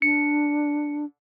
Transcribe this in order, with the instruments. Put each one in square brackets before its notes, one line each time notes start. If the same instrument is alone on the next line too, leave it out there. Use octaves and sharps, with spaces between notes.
[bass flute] D4 [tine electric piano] C#7